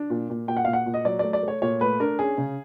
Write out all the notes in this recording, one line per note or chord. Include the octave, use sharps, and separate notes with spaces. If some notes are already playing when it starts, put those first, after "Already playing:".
Already playing: D4
A#2
A#2
A#2 G5
F#5
A#2 F5
F#5
A#2
D#5
F#3 D5
A3 D5
D5
A3
C#5
A#2 C#5
A3 B4
D4 A#4
C#4 G#4
C#3